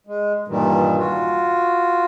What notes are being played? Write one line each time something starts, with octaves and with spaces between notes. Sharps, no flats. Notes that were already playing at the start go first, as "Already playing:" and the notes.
G#3
G2 A#2 D#3 E3 G3
F4 F#4